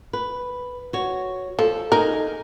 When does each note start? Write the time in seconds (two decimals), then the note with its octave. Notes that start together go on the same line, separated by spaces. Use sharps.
0.13 B4
0.93 F#4 C#5
1.59 F3 A4
1.92 D#4 G#4 A#4